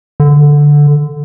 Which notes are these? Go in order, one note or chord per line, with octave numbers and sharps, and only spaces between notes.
D3